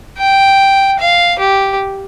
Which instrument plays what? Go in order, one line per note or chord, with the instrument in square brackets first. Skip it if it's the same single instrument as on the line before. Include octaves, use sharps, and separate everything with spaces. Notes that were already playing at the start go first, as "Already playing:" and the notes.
[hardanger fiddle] G5
F5
G4